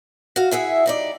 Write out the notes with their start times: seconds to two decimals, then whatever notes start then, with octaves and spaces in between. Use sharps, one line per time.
0.36 F#4 F5
0.51 E4 G#4 E5 F#5
0.86 G3 D#4 D5